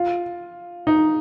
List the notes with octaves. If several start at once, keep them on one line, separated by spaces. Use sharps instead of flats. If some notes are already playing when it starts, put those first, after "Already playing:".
Already playing: F4
D#4